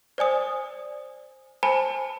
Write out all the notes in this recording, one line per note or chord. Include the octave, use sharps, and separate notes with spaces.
C5 D5 G#5 D#6
C5 G#5 A5 B5